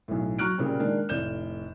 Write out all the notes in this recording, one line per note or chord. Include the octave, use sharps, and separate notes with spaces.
B1 A2
F#3 A#5 C#6 F6 F#6 D7
A#2 C#3 G3 C4
D#3 G#3 A#3 D4
F1 A2 D5 G6 E7